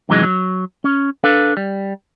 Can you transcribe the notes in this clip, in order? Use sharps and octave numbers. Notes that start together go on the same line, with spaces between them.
F#2 C3 E3 F#3 G#3 D#4
F#3
C#4
D4 A4 B4 F5
G3